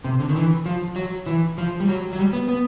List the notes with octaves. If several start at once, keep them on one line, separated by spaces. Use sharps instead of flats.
C3
D3
D#3
E3
F3
F#3
E3
F3
G3
F#3
F#3
G3
B3
B3